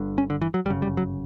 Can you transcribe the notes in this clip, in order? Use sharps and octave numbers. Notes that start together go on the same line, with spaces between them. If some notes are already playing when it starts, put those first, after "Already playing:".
Already playing: G1 G2 D3
C#4
D3
E3
F#3
G1 F#2 C#3 G3
G3
F#3